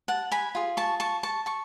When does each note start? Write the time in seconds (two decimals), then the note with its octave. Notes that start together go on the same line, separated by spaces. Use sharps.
0.08 F#5 A5
0.32 G#5 B5
0.55 F4 G#4
0.77 A5 C#6
1.00 A5 C#6
1.23 A5 C#6
1.46 A5 C#6